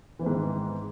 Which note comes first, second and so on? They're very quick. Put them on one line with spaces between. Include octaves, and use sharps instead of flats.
E3 C4 G#2 D#3